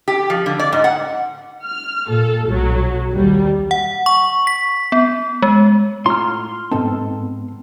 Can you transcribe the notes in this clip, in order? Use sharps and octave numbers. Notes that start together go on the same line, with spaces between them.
G4
F3
D3
D5
G#2
F#5
F6
A#2 A4
B1 F#3
D#2 G3
F#5
C#6
B6
B3
G#3
A2 F4 A#5 C6 F6
G#2 B3 C4 D#4 A4 A5